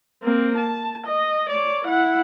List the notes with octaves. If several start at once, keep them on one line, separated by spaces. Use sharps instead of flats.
A#3 C4
A5
D#5
C#5 D5
E4 F#5